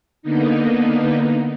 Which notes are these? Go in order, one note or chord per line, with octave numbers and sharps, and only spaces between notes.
D3 A#3 B3 D#4